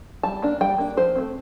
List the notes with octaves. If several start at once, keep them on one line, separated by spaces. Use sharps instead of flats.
G3 A5
A#3 D4
G3 G5
A#3 D4
F3 C5
A3 C4